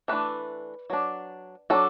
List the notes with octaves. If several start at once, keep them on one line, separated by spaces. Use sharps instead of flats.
E3 A3 D4 B4
F#3 D4
F#3 D4 A4